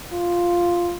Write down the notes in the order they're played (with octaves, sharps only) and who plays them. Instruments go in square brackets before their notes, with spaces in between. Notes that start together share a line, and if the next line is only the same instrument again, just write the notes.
[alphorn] F4